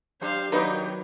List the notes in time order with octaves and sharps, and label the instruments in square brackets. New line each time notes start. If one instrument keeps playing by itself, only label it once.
[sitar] F#3 D4 G4 [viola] C5 F5
[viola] D#3 F#3 [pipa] A#3 B3 D#4 [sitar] D4 F#4 G4